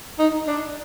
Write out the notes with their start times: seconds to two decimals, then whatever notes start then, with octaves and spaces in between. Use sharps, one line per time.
0.19 D#4
0.48 D4